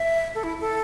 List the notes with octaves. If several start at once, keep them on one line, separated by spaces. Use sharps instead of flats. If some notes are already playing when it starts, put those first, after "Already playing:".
Already playing: E5
A4
E4
A4